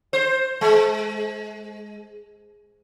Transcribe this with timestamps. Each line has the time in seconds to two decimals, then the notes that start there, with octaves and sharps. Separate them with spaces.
0.13 C5
0.61 G#3